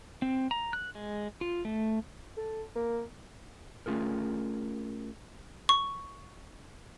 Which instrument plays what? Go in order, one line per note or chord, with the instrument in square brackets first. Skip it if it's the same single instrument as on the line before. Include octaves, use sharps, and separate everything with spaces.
[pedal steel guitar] C4
A#5
F#6
G#3
F4
A3
[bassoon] A4
A#3
[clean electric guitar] A3 C#4 F4 G#4 A#4
[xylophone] C#6